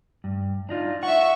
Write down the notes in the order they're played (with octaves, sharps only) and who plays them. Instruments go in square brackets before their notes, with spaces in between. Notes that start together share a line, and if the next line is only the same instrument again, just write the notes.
[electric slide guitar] G2
D4 D#4 F4
[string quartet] E5 C#6 [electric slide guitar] F#5